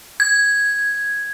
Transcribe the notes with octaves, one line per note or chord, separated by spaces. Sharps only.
G#6